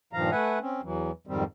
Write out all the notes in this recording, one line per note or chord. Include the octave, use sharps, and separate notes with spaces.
G2 A#2 D#3 F3 F5 A#5
A3 B4 E5 F#5 G#5
C4 C#4
E2 E3 F#3
F2 G#2 D#3 G3 C4